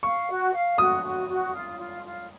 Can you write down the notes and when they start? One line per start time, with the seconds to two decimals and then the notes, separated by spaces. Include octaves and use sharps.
0.03 F5 C#6
0.29 F#4
0.53 F5
0.78 F#4 D#6
1.03 F#4
1.28 F#4
1.53 F4
1.78 F4
2.03 F4